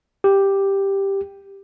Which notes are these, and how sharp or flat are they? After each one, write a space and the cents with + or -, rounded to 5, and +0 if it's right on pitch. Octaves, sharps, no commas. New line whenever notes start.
G4 +5